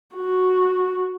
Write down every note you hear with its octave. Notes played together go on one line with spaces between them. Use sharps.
F#4